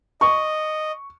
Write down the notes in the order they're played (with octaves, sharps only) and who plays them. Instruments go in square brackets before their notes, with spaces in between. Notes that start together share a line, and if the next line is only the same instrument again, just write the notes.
[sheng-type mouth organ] D#5 [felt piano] C#6